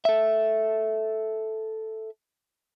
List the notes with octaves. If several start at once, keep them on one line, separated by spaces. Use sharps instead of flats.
A4 E5